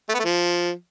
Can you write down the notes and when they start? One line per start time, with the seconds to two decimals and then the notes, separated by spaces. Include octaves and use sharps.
0.09 A3
0.14 B3
0.19 A3
0.24 F3